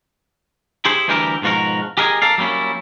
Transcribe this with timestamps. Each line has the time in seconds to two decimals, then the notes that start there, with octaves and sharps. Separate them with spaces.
0.85 E4 G4 G#4 C5
1.08 D2 E3 G3 E4 G4 A#4
1.42 G#2 B2 F3 F4 F#4 A#4
1.97 G4 G#4 A#4 D#5 F#5 G#5
2.22 A4 A#4 D5 F5
2.38 F#3 G3 A#3 C#4 E4